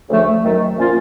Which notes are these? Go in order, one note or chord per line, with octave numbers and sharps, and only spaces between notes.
D2 C#3 F3 A3
F#2 D#3 F#3 A3
A#2 F3 A#3 C#4 F4